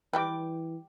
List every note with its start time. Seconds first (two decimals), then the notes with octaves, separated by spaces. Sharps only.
0.13 E3 G3 G4 B4 G5 D6